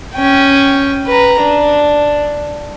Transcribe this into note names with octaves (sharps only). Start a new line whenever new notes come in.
C#4 G5
B4 A#5
D4